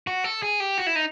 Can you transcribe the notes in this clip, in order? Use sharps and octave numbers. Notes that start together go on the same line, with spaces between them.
F#4
A4
G#4
G4
F#4
E4
D#4